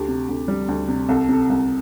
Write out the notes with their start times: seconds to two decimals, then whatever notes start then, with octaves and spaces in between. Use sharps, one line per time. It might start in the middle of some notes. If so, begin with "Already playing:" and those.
Already playing: D2 G4
0.08 C3
0.29 D2
0.48 G3
0.68 D2
0.88 C3
1.09 C2 A4
1.29 C3 A4
1.50 C2